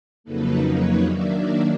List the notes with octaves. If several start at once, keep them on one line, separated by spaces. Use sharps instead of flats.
F2 C#3 F#3 A#3 D#4 A4 B4
B4 C#5
D#3 F#3 A#3 D4 D5 E5
D5 E5